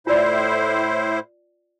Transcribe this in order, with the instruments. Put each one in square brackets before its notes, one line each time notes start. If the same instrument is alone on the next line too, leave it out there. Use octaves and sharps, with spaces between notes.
[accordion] A2 E4 C5 [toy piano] F4 D5